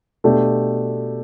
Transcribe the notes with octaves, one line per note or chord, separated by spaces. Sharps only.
B2 A3 D4 G4